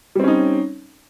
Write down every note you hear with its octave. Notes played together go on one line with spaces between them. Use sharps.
G3 C4 C#4 D#4